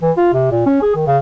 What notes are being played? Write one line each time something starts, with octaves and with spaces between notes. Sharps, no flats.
E3
F4
C3
A#2
C#4
G#4
D#3
C#3